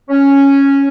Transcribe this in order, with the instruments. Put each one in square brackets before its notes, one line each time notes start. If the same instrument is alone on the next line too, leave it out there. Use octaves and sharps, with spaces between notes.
[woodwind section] C#4